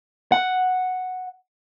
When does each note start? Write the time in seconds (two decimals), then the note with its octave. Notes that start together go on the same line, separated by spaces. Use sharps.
0.32 F#5